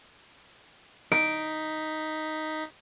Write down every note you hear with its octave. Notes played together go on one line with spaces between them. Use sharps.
D#4 B6 D7